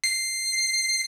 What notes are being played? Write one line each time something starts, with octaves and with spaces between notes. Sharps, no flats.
C7